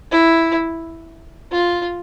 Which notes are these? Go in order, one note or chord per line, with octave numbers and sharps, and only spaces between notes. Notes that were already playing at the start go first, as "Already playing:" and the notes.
E4
F4